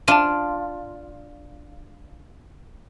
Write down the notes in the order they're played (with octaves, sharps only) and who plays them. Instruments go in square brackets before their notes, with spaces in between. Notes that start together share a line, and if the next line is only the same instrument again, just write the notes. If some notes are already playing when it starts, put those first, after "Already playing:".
[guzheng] D4 F4 [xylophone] A5 D#7